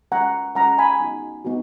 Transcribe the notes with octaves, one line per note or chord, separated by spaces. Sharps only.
G#3 C#4 F4 F#5 A#5
G#3 C#4 F4 F#5 A#5
G#5 B5
B3 D#4 F#4
B3 D#4 F#4